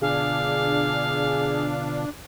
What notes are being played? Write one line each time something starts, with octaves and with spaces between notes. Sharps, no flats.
B2 D3 D4 F4 G#4 F5